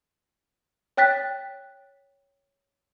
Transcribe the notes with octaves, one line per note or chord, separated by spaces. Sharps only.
C#5 G5 F#6 A6 B6